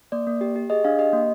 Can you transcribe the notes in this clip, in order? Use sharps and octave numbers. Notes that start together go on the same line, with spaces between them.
A#3 D5
A#3
G4
G4
G#4 D#5
D4 F5
G4 D#5
A#3